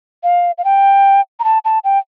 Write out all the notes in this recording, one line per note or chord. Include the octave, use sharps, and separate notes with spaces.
F5
F5
G5
A#5
A5
A5
G5